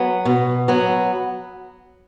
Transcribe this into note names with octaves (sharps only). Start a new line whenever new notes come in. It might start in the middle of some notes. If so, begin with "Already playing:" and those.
Already playing: F#3 B3
B2
F#3 B3